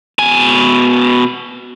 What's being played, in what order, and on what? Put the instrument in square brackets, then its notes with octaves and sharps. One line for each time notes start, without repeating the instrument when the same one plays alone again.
[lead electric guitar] B2 G#5